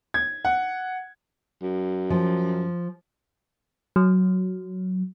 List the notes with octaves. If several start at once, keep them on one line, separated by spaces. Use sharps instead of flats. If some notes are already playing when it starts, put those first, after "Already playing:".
G#6
F#5
F#2
F3
F#3